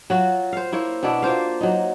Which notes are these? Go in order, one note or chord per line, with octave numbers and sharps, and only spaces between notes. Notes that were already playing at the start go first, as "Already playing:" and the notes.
F#3 F4 F#4
C5 F5
A#3 E4 C5 C#5
B2 B3 D4 E4
A#3 F4 C5 F5
F#3 D#4